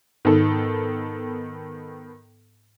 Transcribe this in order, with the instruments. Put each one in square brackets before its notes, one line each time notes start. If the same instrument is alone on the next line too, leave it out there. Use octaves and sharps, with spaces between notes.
[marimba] G#2 D#4 [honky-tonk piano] D#3 B3 A4